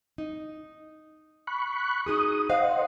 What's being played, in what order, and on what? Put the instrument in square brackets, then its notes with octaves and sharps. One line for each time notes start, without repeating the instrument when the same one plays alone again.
[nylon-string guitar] D#4
[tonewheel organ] B5 C#6 F#6
[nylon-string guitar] D#4 F#4 G#4 [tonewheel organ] D#6
[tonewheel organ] C5 D#5 F#5 [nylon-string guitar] F5